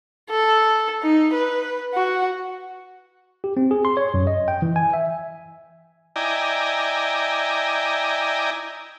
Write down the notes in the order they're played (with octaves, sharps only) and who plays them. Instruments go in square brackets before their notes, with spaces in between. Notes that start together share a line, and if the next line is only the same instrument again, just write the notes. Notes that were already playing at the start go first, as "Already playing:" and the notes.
[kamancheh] A4
D#4
B4
F#4
[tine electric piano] G4
C4
G#4
C6
C#5
F#2
D#5
G5
E3
G#5
E5
[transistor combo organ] E4 D5 D#5 G5 G#5 A#5